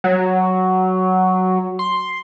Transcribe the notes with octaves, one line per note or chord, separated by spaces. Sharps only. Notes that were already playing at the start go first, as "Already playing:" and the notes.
F#3
C6